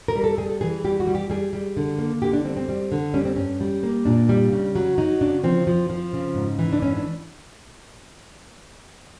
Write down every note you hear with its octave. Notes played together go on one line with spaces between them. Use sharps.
A#4
G3
A4
G3 G#4
A4
E3 G#4
G3 G4
F#4
G3
G4
G3 G#4
G3
D3
A#3
D3 G4
D4
G3 C4
C4
G3
D3
G3 C#4
C4
G2 C#4
G3
A#3
A#2 D4
G3
C#3
F#3
F#3 D#4
C#3 D4
F3 C4
F3
F3
C#3
G#2
E3
D4
G#2 C#4
D4